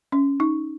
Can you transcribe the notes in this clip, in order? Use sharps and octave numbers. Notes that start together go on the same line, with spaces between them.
C#4
D#4